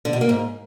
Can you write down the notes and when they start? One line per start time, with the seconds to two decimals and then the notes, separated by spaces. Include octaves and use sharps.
0.05 D3
0.13 B2
0.21 A#3
0.29 G#2